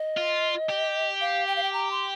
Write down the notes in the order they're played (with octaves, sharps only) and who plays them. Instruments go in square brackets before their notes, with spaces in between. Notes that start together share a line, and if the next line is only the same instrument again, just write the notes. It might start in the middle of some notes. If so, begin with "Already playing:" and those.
Already playing: [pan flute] D#5
[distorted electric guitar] F4
G4
[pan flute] F5
G5
F5
G5
A#5
C6